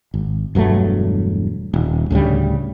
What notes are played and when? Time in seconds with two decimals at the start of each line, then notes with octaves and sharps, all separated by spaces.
0.14 G#1
0.55 E1 G2 F#3 A3
1.73 D#1
2.10 D2 A2 C#3 G3